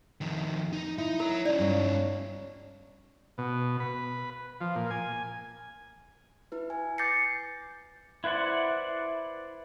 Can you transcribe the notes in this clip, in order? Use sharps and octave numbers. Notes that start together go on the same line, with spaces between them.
F2 D#3
D#4
D#4 E4
A#4 C#5 A#5
C#4 D#4 D5
G2 C#5
B2
B4
F3
A#2
G#5
E4 B4
G#5
D6 G6 A6 A#6 C7 C#7
E4 B4 C5 D5 F#5